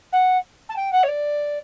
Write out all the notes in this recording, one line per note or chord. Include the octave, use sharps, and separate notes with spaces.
F#5
A5
G5
F#5
C#5
D5